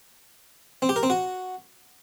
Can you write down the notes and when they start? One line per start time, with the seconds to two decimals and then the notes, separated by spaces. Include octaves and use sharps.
0.82 C4
0.89 G4
0.96 A#4
1.03 C4
1.10 F#4